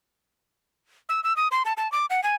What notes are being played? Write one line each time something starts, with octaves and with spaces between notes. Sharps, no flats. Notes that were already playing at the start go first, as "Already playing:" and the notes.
E6
E6
D#6
C6
A5
A5
D6
F#5
G#5